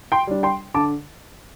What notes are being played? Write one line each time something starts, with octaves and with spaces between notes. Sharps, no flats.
G5 C6
G3 D4
G5 C6
D3 A5 D6